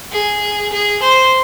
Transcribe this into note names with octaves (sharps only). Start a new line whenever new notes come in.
G#4
G#4
C5